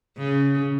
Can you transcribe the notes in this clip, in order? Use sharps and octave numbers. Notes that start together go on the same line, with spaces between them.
C#3